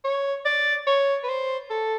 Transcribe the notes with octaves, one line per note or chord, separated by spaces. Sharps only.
C#5
D5
C#5
B4
C5
A4